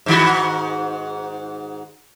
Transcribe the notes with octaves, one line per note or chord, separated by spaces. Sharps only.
G#2 D#3 F#4